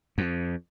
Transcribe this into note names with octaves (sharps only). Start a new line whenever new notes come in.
F2